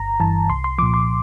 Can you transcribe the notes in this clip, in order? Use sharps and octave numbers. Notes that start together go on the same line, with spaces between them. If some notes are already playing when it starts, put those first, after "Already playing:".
Already playing: G1 A#5
G2 E3 A5
C2 C6
C6
A#2 F3 D6
C6